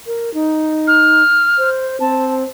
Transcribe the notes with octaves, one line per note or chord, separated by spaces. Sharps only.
A#4
D#4
F6
C5
C4 A5